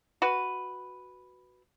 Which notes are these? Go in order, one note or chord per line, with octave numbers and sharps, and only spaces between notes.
F#4 B4